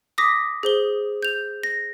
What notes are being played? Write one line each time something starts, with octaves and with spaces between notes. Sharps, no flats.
D6 D#6 A#6 B6
G#4 C5 G7
G6 F7
A#6